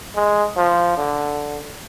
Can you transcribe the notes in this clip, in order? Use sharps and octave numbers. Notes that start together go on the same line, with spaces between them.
G#3
F3
D3